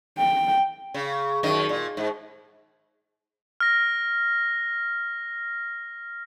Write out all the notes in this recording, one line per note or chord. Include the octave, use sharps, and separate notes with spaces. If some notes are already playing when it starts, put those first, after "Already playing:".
G5
C#3
F#2 D#3 D#5
A#2
G#2
F6 A#6